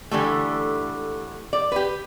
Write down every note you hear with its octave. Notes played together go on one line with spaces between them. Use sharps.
D3 E3 G3 A3
D5
G4 B4